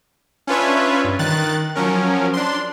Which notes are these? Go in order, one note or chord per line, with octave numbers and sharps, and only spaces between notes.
C#4 D4 F4 B4 C#5 E5
G2
D#3 F#6 A6
F3 F#3 C#4 A#4
D4 C6